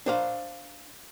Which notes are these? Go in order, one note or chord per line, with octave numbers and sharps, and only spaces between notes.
D4 C5 F5